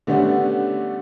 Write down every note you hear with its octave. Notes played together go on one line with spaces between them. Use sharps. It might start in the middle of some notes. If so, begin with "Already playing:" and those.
D3 G3 A3 B3 C#4 D4